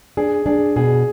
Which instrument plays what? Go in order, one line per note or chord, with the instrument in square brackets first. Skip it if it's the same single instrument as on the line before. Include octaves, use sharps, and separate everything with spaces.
[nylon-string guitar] D4 [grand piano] G#4
[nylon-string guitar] D4 [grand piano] G#4
[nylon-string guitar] B2 [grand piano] G#4